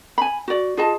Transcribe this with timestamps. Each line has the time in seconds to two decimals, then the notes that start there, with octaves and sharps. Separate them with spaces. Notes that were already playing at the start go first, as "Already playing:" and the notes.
0.18 G#5 B5
0.48 F#4 D5
0.77 F4 G#4 D#5 A5